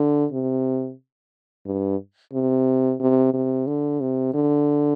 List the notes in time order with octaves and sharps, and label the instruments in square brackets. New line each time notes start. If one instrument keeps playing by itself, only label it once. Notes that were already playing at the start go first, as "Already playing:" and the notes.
Already playing: [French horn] D3
C3
G2
C3
C3
C3
D3
C3
D3